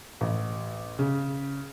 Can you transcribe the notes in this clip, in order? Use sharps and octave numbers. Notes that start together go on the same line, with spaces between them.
A1
C#3